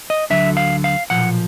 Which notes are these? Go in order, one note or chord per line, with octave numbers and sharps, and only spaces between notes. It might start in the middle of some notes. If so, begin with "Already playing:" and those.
D#5
D2 D3 F#3 E5
F5
F5
B1 A#2 F3 F#5